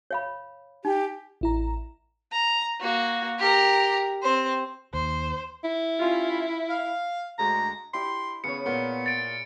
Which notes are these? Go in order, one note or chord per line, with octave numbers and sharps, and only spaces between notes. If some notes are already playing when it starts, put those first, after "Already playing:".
C#5 F5 B5
D#4 G4
A1 E4 A#5
A#5
A#3 F#4
G4 A#4
C4 C5
D#2 C5
E4
G3 C#4 F4
F5
D2 G#3 A#5
D4 E4 G4 C6
C#3 B3 G#4 C#5 C#7
A#2 A#3 B3
A6 D7